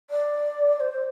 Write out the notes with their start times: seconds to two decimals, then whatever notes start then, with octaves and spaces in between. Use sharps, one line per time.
0.10 D5
0.76 D5
0.80 C5